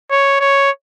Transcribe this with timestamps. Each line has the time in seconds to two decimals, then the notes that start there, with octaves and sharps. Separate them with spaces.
0.11 C#5
0.40 C#5